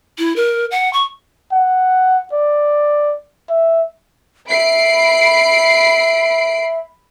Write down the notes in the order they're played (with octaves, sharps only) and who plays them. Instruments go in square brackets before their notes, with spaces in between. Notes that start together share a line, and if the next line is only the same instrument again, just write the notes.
[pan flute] E4
A#4
F#5
C#6
[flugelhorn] F#5
D5
E5
[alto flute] E5 [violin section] B5 C7 D7